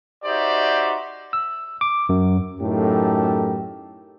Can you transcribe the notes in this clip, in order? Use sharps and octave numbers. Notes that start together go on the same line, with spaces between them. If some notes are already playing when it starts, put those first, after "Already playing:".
D#4 F#4 G4 C5 D5 E5
E6
D6
F#2
F#2 A2 D#4 G4 A4 A#4